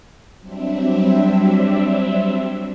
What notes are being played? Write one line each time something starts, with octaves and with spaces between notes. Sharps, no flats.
F#3 G3 C4 D4 E5